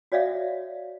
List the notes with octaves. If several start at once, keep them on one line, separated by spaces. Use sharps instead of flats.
F#4 C#5 D5 E5 F5